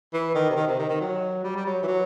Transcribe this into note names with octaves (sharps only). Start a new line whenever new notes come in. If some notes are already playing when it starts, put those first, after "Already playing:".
E3
D#3
C3
D#3
C3
D#3
D#3
F#3
G3
G3
F#3
E3
F#3